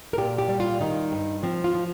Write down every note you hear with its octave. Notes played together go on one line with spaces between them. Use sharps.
A#4
A#2 G4
G4
G3
F4
D#3 D#4
G2
F3 C4
F4
F3